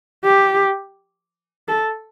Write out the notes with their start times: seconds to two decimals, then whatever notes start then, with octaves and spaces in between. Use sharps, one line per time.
0.25 G4
1.68 A4